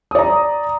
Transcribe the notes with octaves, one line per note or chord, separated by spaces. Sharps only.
D5 A#5 D#6